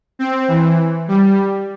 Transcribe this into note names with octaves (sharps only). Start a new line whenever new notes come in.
C4
E3
G3